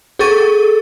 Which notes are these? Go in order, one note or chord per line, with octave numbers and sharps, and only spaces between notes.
G#4 A4 C#6 A6 D#7